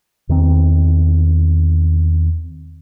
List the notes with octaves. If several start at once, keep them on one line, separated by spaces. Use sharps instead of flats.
E2 D#3 C4